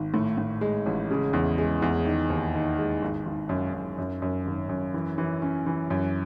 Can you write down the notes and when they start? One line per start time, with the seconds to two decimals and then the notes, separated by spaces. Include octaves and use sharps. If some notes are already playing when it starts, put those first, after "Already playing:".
Already playing: G#1
0.14 A2
0.38 A2
0.61 G#3
0.86 A1
1.10 C#3
1.33 E2
1.58 G#3
1.82 E2
2.06 D#3
2.30 D#2
2.54 D#3
2.78 G#3
3.02 G#1
3.26 G#1
3.49 F#2
3.74 F#2
3.98 F#2
4.22 F#2
4.46 G#1
4.69 F#2
4.94 E3
5.18 E3
5.42 C#4
5.66 E3
5.90 F#2